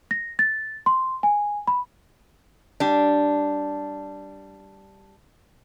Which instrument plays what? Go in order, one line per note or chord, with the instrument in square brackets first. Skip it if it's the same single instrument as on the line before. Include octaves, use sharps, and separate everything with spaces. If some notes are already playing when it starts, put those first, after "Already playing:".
[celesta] A#6
A6
C6
G#5
B5
[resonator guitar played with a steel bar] G3 D4